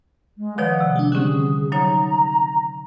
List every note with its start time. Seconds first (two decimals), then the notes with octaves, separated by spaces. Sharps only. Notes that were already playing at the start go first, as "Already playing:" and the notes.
0.38 G#3
0.58 D#3 F3 B4 C#5 D5 F#5 D#6
0.80 C3
0.96 G#3 D4
1.12 D3 G3 C4 C#4 G#4
1.72 F#3 D#4 C#5 A#5